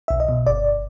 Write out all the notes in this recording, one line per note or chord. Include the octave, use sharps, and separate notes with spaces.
B1 E5
D#5
B2
G1 D5